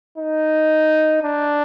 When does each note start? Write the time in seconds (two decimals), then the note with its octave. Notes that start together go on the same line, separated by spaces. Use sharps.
0.18 D#4
1.23 D4